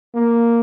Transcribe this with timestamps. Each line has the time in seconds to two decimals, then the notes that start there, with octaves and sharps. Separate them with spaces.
0.14 A#3